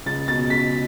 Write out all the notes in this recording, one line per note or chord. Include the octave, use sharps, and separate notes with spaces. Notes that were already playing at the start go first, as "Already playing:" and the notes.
C#2 A6
B2 A6
C#2 B6